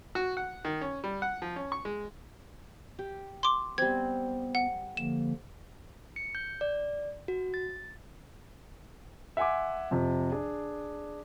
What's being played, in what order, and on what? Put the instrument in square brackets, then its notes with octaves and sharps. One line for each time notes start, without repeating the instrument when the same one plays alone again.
[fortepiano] F#4
F#5
D#3
C#4
G3
F#5
F3
C#4
C#6
G#3
[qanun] G4
[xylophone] C6 D6
[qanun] G3 C4 [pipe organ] B3 [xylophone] G#6
[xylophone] F#5
[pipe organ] D3 F3 A#3 [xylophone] E7
[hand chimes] C#7
G6
D5
F#4
A6
[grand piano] E5 F#5 G#5 C6 D6
F2 C3 F3
D4 G#4